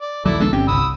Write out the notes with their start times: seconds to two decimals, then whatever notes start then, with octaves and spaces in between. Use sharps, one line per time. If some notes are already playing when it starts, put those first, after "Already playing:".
0.02 D5
0.25 A#1 D#2 F#3 E4 A4 D5
0.40 G#3 B3 D4 A4
0.53 G1 C4 C#4 G4
0.68 C2 C3 B5 D#6 E6